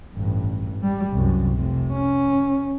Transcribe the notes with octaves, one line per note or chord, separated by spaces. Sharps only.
A1 G2
G3
C2 F#2
F1 C3
C#4